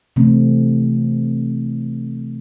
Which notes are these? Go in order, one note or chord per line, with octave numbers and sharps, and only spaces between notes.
C3 E3 A3 C4